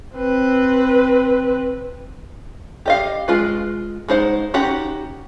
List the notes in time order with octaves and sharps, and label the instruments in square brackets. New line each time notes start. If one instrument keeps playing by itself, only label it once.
[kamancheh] C4 B4
[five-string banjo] G4 D#5 F5
G#3 F4 B4
G#3 D#4 C5 F#5
C#4 D#4 F#4 G4 F#5